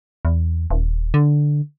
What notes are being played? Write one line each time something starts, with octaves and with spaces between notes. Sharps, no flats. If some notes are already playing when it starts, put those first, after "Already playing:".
E2
D#1
D3